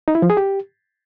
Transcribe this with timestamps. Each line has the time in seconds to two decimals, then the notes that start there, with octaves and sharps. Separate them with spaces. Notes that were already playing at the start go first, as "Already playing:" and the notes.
0.08 D#4
0.15 E4
0.22 F3
0.30 G#4
0.37 G4